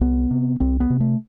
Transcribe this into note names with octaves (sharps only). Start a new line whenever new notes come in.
C2 B3
C3
C2 C4
B3
C3
A3